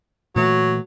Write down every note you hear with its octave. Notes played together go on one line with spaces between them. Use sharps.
A#2 E3 F#3 A3